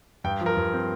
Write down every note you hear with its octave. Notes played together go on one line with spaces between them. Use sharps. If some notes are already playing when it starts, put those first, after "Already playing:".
G2 G5
F3
A#4
G2
C4